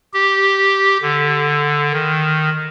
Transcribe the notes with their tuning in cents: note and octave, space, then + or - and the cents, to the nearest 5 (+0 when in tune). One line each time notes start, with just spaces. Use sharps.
G4 -5
D3 +0
D#3 +0